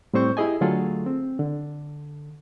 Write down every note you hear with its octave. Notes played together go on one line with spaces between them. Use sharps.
A2 G3 C4 C5 C#6 G6
E4 G4 G#4 D#5 G#5
D3 F#3 A3 F4 G#4 A4
C4
D3